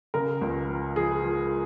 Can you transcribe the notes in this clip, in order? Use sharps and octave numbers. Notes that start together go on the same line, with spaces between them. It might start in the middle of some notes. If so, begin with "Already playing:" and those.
C#3 A#4
C#2
F3
F3 G#4
F3